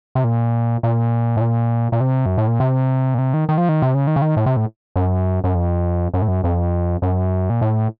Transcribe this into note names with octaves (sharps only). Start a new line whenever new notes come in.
C3
A#2
A#2
A2
A#2
A#2
C3
F#2
A2
A#2
C3
A#2
C3
D#3
D#3
F3
D#3
C3
C#3
D#3
C#3
D#3
A2
C3
A2
F#2
F#2
F2
F#2
A2
F#2
F2
F#2
A#2
A2